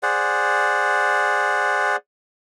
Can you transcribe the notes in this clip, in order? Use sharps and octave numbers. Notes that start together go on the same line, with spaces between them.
G#4 C5 D5 F#5